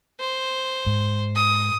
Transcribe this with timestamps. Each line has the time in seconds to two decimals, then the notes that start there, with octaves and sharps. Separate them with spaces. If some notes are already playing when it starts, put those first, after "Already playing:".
0.20 C5
0.86 G#2
1.36 D#6